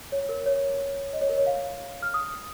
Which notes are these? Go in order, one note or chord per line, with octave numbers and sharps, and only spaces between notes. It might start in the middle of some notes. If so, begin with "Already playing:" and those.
C#5
A#4
C#5
D#5
C#5
A#4
C#5
F5
F6
D#6